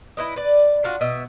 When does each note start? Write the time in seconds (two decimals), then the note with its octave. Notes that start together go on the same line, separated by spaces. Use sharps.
0.17 E4 B4 D#5
0.36 B4 D5
0.84 D4 F4 F#4
1.01 B2 D#5 E5